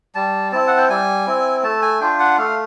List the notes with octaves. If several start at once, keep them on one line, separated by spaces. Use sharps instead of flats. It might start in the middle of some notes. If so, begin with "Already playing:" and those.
G3 A5
C4 E4 A5
F#5
G5
G3 G#5
C4 E4
A3 A5
G#5
D4 F4 G5
F#5
A3 F5